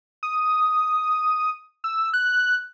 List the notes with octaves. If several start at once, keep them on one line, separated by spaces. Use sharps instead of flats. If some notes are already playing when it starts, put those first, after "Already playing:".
D#6
E6
F#6